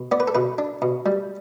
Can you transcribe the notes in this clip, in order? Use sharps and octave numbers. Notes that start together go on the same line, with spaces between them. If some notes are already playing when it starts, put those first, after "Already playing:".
Already playing: B2
B3 D5
B4
A4
B2 B4
D4
B2
G3